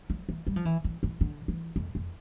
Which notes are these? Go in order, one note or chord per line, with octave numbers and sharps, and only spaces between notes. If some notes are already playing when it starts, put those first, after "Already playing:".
F3
E3
G3
F3
E3
E3
E3
D3
E3
F2
F2